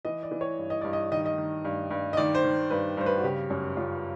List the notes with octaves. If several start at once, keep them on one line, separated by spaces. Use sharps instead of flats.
E3 D#5
D5
E3
C#5
G2
D#5
G2 D5
D#5
D#3 D#5
D#5
D#3
G2
G2
D#5
D#3 D5
C5
D#3
G2 B4
G2 C5
B4
F#4
C#3 G4
F#2
F#2 F4